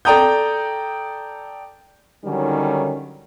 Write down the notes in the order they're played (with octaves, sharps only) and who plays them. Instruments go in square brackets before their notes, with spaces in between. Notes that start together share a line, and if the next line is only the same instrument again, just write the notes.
[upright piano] A4 D5 G5 A#5 D#6 G6
[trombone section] D3 D#3 F#3 G3 C#4 D#4